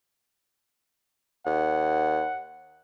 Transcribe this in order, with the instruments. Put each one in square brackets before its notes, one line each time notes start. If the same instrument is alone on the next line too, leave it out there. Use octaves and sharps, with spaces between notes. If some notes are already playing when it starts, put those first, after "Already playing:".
[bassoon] D#2 [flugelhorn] F#5